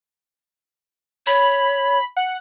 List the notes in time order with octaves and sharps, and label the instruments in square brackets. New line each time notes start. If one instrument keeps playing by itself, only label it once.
[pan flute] C#5 [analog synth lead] B5
[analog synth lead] F#5